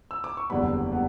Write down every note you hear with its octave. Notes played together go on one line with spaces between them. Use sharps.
E6
D6
C#6
F#1 E2 D3 G3 B3 B5
G3 B3